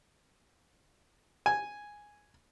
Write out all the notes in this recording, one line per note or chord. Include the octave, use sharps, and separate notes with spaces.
G#5